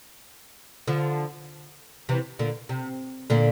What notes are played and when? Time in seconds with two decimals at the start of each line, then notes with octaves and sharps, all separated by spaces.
0.87 D3 F3
2.09 C3 E3
2.39 A#2 D3
2.69 C3
3.30 A#2 D3